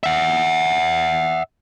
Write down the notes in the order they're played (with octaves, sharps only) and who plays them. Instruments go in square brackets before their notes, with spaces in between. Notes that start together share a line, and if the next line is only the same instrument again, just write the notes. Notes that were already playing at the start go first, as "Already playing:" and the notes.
[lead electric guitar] E5 F#5